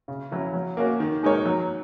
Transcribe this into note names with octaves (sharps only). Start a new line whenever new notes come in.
C#3
F#3 C#4 E4
F#3
A#3 C#4 F#4
D#3
G#3 D#4 A#4 C#5
F#3